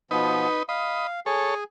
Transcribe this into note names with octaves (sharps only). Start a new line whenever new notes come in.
B2 F3 B3 D#4 B4
D#5 F5 B5
G#4 A4 C#5 G#5